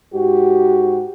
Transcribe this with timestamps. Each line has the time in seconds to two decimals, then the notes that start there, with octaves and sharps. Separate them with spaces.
0.13 G#2 F#4 G4